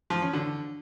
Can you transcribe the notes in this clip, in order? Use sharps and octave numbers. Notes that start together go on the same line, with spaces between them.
F3
C#4
D3